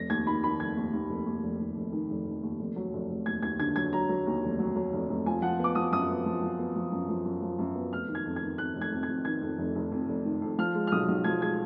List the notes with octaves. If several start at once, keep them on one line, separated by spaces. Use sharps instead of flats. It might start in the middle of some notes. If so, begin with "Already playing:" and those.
Already playing: F1 A#6
D#2 G#6
D#3 B5
D#3 B5
F1 G#6
D#2
D#2
F1
D#2
F1
D#2
F1
D#3
F1
F1
D#2
F1
F#3
F1
F1
D#2 G#6
D#2 G#6
D3 G#6
F#3 G#6
F#3 A#5
F#3
D#2
F1
F#3
F#3
F1
F1
F3 G#5
F3 F#5
B3 D6
F3 D#6
F#2 D#6
B3
F3
F3
B3
F3
F#2
F3
F#2
F3
F#2
B3
F1 F6
D#3
G#6
F2
G#6
D#3
F2 F#6
F1
G#6
F2
G#6
F2
D#3 G#6
F2
F1
F1
F2
F1
D#3
F2
F3 F6
G#3
F6
B1 D#6
B1
F3 G#6
G#3 G#6